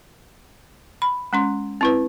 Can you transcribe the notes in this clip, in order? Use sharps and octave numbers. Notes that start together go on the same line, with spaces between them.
B5
G#3 C#4 C6
C4 E4 B4